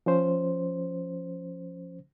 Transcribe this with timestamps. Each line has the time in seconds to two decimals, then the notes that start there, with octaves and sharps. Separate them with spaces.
0.06 F3 C#4 C5